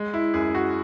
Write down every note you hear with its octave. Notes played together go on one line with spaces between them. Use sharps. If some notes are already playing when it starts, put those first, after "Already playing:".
Already playing: G#3
E4
F#2 G#4
F#4